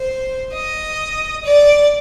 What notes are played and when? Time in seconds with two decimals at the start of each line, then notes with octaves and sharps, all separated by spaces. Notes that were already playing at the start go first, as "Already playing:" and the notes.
Already playing: C5
0.54 D#5
1.44 D5